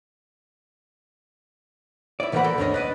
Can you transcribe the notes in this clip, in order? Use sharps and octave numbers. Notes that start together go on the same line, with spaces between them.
E4 D5
B1 E3 F3 A#3 F#5 B5
A4 A#4
D2 G2 C#4 D4 C#5 D#5
B4 D5 D#5